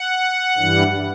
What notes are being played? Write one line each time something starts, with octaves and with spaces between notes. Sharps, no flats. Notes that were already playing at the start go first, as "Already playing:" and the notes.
Already playing: F#5
G2 E3 G3